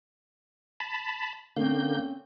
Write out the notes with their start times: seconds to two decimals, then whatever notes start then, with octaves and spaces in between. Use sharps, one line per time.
0.80 A5 B5
1.57 D3 A#3 C4 C#4 F5 G6